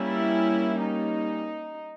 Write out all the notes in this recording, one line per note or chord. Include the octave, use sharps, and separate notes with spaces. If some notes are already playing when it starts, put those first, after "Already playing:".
Already playing: G3 A#3 C#4 E4
D#4